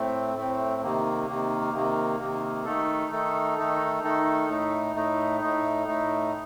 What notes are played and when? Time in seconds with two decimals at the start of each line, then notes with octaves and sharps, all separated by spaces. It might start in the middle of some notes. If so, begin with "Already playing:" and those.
Already playing: A2 A3 C4
0.36 A2 A3 C4
0.82 C3 D#3 A#3
1.28 C3 D#3 A#3
1.74 C3 D#3 A#3
2.20 C3 D#3 A#3
2.65 D#3 A3 D#4 A4
3.11 D#3 A3 D#4 A4
3.58 D#3 A3 D#4 A4
4.03 D#3 A3 D#4 A4
4.49 A2 A3 D#4
4.96 A2 A3 D#4
5.41 A2 A3 D#4
5.87 A2 A3 D#4